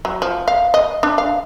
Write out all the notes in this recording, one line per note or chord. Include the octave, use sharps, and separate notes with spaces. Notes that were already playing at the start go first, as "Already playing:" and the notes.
F#3
F3
F5
D#5
D4
F5